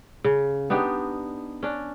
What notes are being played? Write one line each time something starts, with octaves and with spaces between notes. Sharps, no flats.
C#3
B3 D4 D#4 G4
C#4 D4